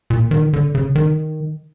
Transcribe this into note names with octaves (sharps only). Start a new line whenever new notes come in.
A#2
D#3
D3
C#3
D#3